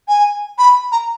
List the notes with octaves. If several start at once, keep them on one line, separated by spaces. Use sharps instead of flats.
G#5
B5
A#5